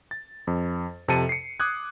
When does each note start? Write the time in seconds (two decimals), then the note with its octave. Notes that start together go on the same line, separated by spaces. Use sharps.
0.11 A6
0.47 F2
1.08 F2 C3 A4 A5 C#7 D#7
1.29 C7 C#7
1.60 D6 D#6 F#6 G#6